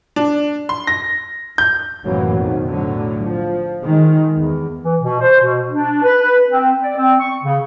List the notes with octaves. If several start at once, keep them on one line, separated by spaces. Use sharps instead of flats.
D4
C6
A#6
G6
C2 F#2 A2 E3 F#3 A#3
B1 F2 D#3
A2 D3 F#3
F3
D#3 G#3
E2
E3
B2
C5
B2
D4
B4
C4
D5
C4
C#6
C#3